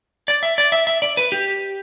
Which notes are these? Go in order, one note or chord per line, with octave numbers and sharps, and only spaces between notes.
D5
E5
D5
E5
E5
D5
B4
G4